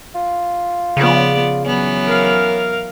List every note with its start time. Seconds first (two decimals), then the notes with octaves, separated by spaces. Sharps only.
0.15 F4
0.97 C#3 F3 B3 D5
1.65 E3 F#3 B3 C#4
2.05 A#4 F5